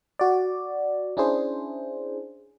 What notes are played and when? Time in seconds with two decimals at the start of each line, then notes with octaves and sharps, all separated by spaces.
0.19 F#4 D5
1.17 C#4 D4 E4 G#4 C5